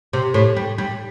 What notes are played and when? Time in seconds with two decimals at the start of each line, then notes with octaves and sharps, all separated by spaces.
0.13 C3
0.34 A2
0.56 G3
0.78 G3